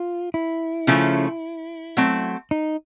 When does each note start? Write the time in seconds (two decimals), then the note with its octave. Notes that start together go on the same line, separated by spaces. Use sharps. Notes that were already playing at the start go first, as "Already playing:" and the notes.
Already playing: F4
0.34 E4
0.87 C#3 F3 A3 C#4
1.97 F#3 A3 C4
2.51 D#4